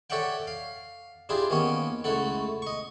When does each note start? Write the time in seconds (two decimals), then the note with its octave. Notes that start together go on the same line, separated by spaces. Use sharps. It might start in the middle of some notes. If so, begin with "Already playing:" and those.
0.10 A4 C#5 D5 E5 F#5 G5
0.47 F5
1.29 D4 E4 F4 G4 G#4
1.50 D#3 A#3 B3 C#4 C#5
2.04 C#2 A3 E4 A4 F#5
2.62 D#5 C#6